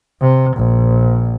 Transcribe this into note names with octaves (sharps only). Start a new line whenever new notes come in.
C3
A#1